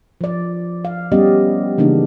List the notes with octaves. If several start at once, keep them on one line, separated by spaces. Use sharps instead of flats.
F3 D5
F5
G3 B3 C#4 G4 D5 D#5
C#3 E3 A#3 D4 D#4